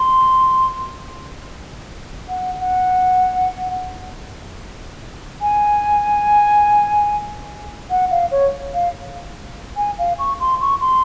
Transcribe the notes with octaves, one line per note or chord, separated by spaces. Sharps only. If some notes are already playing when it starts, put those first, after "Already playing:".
Already playing: C6
F#5
F#5
G#5
F#5
F5
C#5
F5
G#5
F5
C#6
C6
C#6
C6